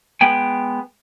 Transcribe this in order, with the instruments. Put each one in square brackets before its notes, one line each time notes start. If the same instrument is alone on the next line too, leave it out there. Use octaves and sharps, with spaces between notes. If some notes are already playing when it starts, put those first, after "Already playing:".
[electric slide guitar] G#3 B3 G5 G#5